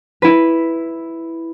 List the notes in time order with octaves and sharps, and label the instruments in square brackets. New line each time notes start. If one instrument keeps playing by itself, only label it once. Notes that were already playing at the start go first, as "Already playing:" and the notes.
[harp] E4 B4